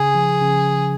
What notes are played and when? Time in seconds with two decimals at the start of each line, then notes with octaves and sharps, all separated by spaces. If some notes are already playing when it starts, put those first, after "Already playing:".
Already playing: C#3 G#4
0.15 F3
0.41 C#3